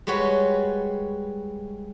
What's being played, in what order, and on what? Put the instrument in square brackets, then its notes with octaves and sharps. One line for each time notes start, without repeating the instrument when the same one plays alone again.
[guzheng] G3 G#3 F#4 B4 C#5